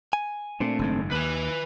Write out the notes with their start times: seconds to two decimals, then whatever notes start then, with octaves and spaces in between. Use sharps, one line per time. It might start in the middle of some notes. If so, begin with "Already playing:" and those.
0.13 G#5
0.60 A#2 A3 C4 D4
0.79 F#1 G#2 D#3
1.12 D#2 B4 G#5 F#6